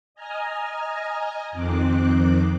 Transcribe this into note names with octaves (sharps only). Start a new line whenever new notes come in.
D#5 G#5 A#5 F6
F2 D#3 C4 D6 F#6